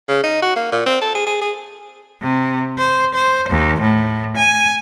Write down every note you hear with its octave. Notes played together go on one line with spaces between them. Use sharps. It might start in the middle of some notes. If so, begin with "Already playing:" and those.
C#3
D#4
F#4
A#3
A#2
C4
A4
G#4
G#4
G#4
C3
C5
C5
D#2
A2
G#5